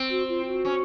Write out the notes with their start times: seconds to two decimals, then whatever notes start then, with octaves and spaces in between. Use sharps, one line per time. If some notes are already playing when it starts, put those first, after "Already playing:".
Already playing: C4
0.10 F#4
0.29 F4
0.46 F#4
0.65 C#4